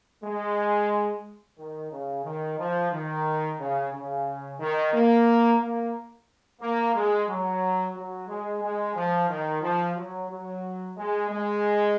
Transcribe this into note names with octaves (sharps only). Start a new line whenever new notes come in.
G#3
D#3
C#3
D#3
F3
D#3
C#3
C#3
D#3
A#3
A#3
A#3
G#3
F#3
F#3
G#3
G#3
F3
D#3
F3
F#3
F#3
G#3
G#3